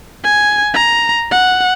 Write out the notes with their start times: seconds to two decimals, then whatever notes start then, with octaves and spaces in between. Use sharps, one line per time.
0.24 G#5
0.74 A#5
1.31 F#5